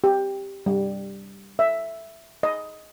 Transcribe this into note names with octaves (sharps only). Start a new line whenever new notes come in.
G4
G3
E5
D#5